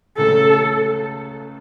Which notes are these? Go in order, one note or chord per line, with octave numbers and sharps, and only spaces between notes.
C#2 C#3 A3 A4